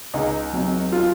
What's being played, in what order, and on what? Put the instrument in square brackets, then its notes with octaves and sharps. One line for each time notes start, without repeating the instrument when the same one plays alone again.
[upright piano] C#2 D#4
C3 F#3
F4